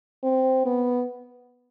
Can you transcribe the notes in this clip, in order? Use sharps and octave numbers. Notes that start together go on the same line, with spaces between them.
C4
B3